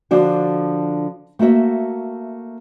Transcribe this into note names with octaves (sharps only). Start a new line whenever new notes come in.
D3 F3 D4 F#4
A3 A#3 F#4 E5